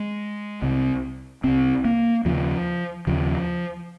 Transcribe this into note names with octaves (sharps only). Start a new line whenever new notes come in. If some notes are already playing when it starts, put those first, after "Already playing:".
Already playing: G#3
C2 C3
C2 C3 C4
A#3
D#2 C#3 F3
D#2 C#3 F3